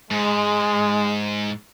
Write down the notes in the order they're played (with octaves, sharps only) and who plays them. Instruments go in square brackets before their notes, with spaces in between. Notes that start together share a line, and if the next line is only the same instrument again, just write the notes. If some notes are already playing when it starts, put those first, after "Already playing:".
[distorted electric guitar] G#2 [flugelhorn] G#3